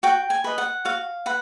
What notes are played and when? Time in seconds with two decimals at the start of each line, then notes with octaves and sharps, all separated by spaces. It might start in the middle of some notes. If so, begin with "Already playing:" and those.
0.03 F#4 G5
0.30 G#5
0.44 B4 D#5
0.58 F#5
0.85 F#4 F5
1.26 B4 F#5